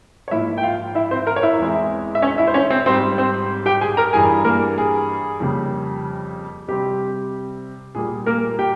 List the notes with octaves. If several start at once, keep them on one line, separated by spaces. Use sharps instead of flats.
C#5
G#2 F3 A#3 E4 E5
G5
F4 F5
E4 E5
C4 C5
A#4 A#5
C#5
E4 E5
E2 E3 G#3 C4
E5
C#4 C#5
E4 E5
C5
C#4 C#5
C4 C5
G#2 G3 C4 C5
C4 C5
G4 G5
G#4 G#5
A#4 A#5
G2 E3 G3 G#4 G#5
A#3 A#4
G#4
F2 C#3 G3 A#3
C3 G3 C4 G4
A#2 G3 A#3 G#4
A#3 A#4
G4 G5